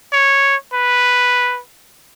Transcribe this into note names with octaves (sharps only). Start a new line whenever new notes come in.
C#5
B4